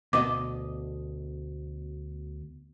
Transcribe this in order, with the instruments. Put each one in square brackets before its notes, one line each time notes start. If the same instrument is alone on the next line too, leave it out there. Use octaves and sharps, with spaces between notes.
[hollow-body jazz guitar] D2 B2 D#5 [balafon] D6